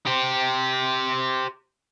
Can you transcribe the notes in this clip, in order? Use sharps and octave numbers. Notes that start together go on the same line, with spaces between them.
G4 C5